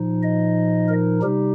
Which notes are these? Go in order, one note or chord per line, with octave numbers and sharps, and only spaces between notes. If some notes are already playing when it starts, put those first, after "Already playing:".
Already playing: A#2 F3 D#4
D#5
A#4
C3 G3 D#4 G4